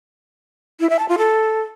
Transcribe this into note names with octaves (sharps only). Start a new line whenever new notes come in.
E4
E5
A5
F4
A4